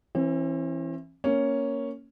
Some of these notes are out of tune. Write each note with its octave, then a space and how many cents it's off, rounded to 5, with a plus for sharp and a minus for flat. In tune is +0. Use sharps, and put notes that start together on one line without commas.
E3 +5 C4 +45
A#3 +0 C#4 +0